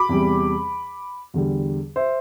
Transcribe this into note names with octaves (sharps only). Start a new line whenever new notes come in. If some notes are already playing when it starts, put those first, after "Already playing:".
Already playing: B5 D6
E2 C3 G3
E2 D3 G3
C5 E5